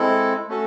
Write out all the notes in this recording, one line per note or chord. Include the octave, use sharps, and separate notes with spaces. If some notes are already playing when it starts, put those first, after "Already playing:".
Already playing: G#3 C4 E4 A4
A3 C#4 F#4 A4